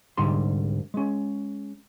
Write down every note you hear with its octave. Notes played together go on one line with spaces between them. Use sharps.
C2 G#2 D3 G3 C6
G#3 C#4